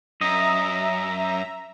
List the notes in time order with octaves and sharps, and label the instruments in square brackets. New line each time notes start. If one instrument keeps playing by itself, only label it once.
[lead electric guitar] F#2 [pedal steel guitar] D#5 [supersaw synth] E5 A#5